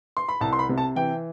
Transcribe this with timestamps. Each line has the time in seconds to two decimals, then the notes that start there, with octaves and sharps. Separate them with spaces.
0.17 C6
0.29 B5
0.41 C2 A5
0.53 C6
0.59 B5
0.69 C3
0.78 A5
0.96 E3 G5